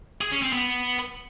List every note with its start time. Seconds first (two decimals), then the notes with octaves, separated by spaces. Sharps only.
0.21 G#4
0.32 C#4
0.42 C4
0.53 B3